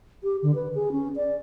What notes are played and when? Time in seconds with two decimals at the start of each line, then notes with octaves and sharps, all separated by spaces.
0.23 G4
0.43 D3
0.55 B4
0.75 G#4
0.92 C#4
1.16 D5